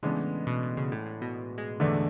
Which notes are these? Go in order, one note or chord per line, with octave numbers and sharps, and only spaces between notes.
A2 C#3 E3 G#3 B3 D4
B2
B2
C#3
A2
A2
B2
G#3
E2 D3 A3 D4